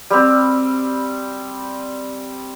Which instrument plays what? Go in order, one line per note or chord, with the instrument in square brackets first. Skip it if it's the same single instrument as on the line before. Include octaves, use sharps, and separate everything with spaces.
[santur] G3 C4